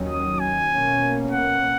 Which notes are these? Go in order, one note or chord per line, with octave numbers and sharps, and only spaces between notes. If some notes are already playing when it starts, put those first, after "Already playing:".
Already playing: D#2 D#3 F#3 C#4
D#6
G#5
B2 A#3 C#4
F#5